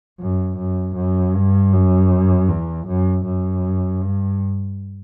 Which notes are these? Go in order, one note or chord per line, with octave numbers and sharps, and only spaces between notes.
F#2
F#2
F#2
G2
F#2
E2
F#2
F#2
G2